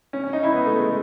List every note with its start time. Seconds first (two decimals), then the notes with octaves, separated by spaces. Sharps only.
0.13 C#4
0.24 C#4
0.33 D#4
0.43 E4
0.52 B3
0.66 A3
0.79 G#3